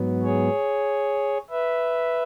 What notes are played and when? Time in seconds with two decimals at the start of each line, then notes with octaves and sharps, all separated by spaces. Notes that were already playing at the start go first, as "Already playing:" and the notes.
Already playing: G#2 F#3 B3
0.23 G#4 C#5
1.50 B4 E5